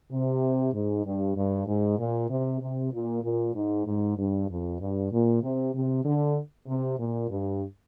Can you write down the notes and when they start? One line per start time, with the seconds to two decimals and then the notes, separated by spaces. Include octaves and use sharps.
0.11 C3
0.74 G#2
1.05 G2
1.36 G2
1.67 G#2
1.99 A#2
2.30 C3
2.61 C3
2.92 A#2
3.23 A#2
3.55 G#2
3.86 G#2
4.18 G2
4.50 F2
4.81 G2
5.12 A#2
5.43 C3
5.74 C3
6.05 D3
6.68 C3
6.99 A#2
7.30 G2